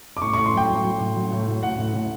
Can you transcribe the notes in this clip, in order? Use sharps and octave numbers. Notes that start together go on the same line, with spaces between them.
D6
A2 C#6
A2 C#6
C6
F#3 G5
F#3
F#3
A2
F#3
A2
A2
A2 F#5
A2
A2